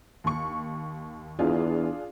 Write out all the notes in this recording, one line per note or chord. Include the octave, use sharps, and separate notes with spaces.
D#2 C#6
E2 D4 F4 G#4